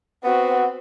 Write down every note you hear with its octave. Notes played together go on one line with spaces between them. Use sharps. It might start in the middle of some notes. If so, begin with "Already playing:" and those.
B3 C4 F#4